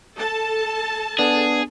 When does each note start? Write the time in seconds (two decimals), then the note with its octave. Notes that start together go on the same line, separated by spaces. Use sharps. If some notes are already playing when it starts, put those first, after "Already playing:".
0.15 A4 A5
1.19 B3 D4 G#4